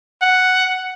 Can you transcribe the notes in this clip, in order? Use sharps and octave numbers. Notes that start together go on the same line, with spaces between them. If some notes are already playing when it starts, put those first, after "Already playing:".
F#5